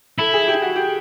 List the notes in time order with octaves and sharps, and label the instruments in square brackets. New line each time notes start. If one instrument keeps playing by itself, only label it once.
[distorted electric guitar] E4 [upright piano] A4
[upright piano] G#4
G4
F#4
G4